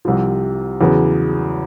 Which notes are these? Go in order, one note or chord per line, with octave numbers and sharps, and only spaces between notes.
C2 C3 F3
E2 C#3 F#3 B3